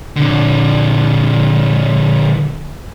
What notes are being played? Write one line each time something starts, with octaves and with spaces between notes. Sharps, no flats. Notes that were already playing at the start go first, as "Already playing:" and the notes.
A#2 D3